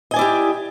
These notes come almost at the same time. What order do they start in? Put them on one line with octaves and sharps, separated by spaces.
D#5 G#5 D5 E4 G4